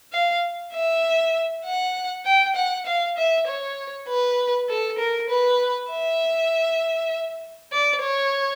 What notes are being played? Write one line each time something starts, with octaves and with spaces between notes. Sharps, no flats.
F5
E5
F#5
G5
F#5
F5
E5
C#5
B4
A4
A#4
B4
E5
D5
C#5